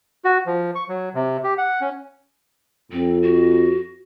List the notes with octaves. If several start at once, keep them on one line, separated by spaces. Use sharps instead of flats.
F#4
F3
C#6
F#3
C3
G4
F#5
C#4
F2 C4
F#4